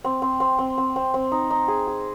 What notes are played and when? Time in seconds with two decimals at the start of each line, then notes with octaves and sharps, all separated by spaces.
0.04 C4
0.22 C4
0.40 C4
0.59 C4
0.78 C4
0.96 C4
1.14 C4
1.32 D#4
1.51 D#4
1.68 G#4
1.87 G#4